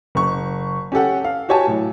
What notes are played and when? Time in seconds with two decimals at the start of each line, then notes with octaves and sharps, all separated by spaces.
0.15 F#1 C#6
0.92 C#4 G4 A4 F#5
1.24 F5
1.49 F#4 G4 C#5 G#5 A5
1.67 A2 F#3